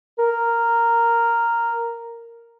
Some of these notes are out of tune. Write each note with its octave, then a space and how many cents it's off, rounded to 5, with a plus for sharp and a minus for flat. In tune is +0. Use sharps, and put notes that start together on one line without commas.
A#4 -5